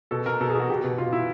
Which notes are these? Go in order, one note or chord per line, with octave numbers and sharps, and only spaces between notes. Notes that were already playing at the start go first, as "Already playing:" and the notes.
B2 A4
B2 A#4
B2 A4
G#4
B2 F#4
B2 G4
B2
B2 F4
B2 E4